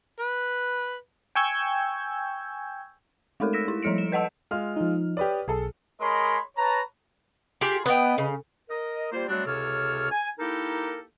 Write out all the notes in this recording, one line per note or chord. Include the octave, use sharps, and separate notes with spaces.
B4
G5 G#5 C#6 E6 G6 G#6
G#3 A3 D#4 A4 A#4
E6 A#6 B6 E7
E4
F3 G3 A4 C#7 D7
E7
B4 D#5 F#5 A5 E6
G#3 F4 F6
F3 D#4
G4 B4 C#5 D5 D#6
B1 G#4 A4
G#3 A#4 C#5 D#5 B5 C6
B4 C#5 A5 A#5
F4 G4 G#4
B3 B4 D#5 G5
C#3
A#4 D#5
G3 A#3 F4 C5
F#3 G3 A3 C4 D4 F#4
C#2 C3 A4 C#5 F6
G#5
A#3 D#4 E4 G4 A4 A#4